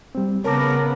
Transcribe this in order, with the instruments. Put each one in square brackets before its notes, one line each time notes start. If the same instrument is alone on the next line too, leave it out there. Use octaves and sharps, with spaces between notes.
[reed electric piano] G3 C4
[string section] C#3 B3 [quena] A#4 [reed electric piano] C#5 A5 D6